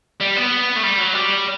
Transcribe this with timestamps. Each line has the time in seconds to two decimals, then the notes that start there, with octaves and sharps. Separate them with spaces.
0.20 G3
0.36 B3
0.76 A3
0.83 G3
0.99 F#3
1.14 G3